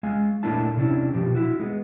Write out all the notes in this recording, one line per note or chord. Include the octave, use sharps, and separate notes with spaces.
G#3 F5 G#5
A#2 A3 A#3 D4 E4 A5
C3 C#4 D4 E4
B2 F3 G4
E4 F#4
G#3 A#3 B3